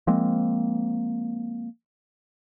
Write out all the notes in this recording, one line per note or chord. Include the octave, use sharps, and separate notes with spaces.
F3 G#3 A#3 C4